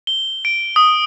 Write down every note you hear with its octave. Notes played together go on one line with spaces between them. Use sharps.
G7
D7
D#6